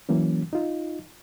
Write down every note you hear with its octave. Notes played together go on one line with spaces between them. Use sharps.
E3 F#3 A#3 C#4
D#4 F4